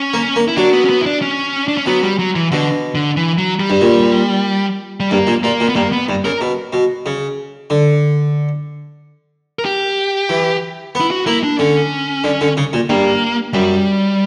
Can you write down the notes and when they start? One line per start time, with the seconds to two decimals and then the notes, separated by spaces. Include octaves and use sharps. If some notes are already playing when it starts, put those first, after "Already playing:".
Already playing: C#4
0.14 A#3
0.36 A#3
0.48 E4
0.57 F#3 D4
0.73 B3
0.85 C#4
0.90 B3
1.01 E4
1.06 D4
1.22 C#4
1.68 D4
1.77 C#4
1.86 F#3 B3
2.03 G3
2.19 F#3
2.36 E3
2.51 B2 D3
2.95 D3
3.17 E3
3.38 F#3
3.60 G3
3.70 G2
3.81 A#2
5.00 G3
5.11 G2 A#3
5.27 A#2
5.43 A#2 A#3
5.60 A#2
5.69 B3
5.75 G2 A#3
5.92 B3
6.09 G2
6.25 C#3 A#4
6.41 B2
6.73 B2
7.06 C#3
7.70 D3
9.59 A#4
9.65 G4
10.29 E3
10.95 B3
11.01 E4
11.11 F#4
11.27 A#3 E4
11.44 D4
11.59 D3 C#4
12.24 D3
12.41 D3
12.57 C#3
12.73 A#2
12.89 G2 A#3
13.54 F#2 G3